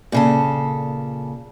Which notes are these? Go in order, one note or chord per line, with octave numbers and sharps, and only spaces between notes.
A#2 C#3 A4